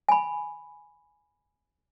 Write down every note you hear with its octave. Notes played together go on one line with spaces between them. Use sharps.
G#5 B5